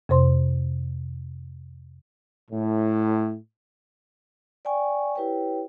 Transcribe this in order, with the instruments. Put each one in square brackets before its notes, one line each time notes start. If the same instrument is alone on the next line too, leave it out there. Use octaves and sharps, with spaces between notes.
[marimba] F2 C3 C5 C6
[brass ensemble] A2
[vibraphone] D5 G5 G#5 C#6
E4 G4 B4 C#5 G5